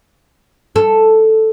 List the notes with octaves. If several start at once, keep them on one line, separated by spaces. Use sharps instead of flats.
A4